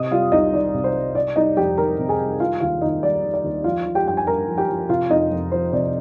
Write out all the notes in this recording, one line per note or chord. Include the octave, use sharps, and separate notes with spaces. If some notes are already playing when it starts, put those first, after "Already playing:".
Already playing: C3 D#5 D#6
G3 F4 F5
C2 D#4 D#5
D#3 D5
C3
C5
G3
C3 D5
G3 D#4 D#5
F2 G4 G5
D#3 A#4 A#5
C3
G#4 G#5
G3
D#3 F4 F5
D#2 F4 F5
D#2 D#4 D#5
G3 D5
D#3
D5
D#2
F3 F4 F5
F3
G4 G5
G2 G5
G#5
G2 A#4 A#5
F3
G4 G5
F3
C3 F4 F5
F2 D#4 D#5
F2
F3 C5
C3 D5